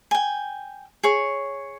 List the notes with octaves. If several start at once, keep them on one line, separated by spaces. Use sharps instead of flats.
G5 G#5
G#4 C#5